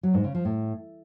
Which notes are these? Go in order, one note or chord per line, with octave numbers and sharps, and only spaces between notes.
F#3
G#2
C#3
F3
A2